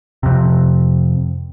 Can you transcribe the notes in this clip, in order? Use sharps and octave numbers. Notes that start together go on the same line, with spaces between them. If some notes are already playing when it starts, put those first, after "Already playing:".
F2 C3